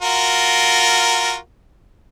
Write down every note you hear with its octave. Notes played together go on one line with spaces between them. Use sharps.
F4 F#4 A#4